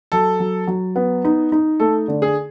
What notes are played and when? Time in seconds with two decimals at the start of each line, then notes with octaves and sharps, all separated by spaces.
0.12 F#3 A4
0.40 F#3
0.67 F#3
0.96 B3
1.24 D#4
1.52 D#4
1.80 A3 A4
2.08 D3
2.22 G#4